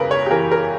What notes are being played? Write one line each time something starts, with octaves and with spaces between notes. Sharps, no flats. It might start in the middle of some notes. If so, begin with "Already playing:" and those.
Already playing: E1 E2 C#3 A#4 B4
C#5
G4
E3 A#4
A#4